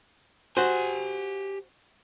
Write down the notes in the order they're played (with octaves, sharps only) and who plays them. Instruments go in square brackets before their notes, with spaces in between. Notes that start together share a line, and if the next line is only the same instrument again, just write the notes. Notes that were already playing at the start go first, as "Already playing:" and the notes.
[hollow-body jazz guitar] F#4 C5 [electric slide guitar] G4 G#5